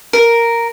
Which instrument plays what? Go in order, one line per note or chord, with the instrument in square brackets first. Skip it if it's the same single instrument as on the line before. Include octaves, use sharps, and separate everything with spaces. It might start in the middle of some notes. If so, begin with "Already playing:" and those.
[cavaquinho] A#4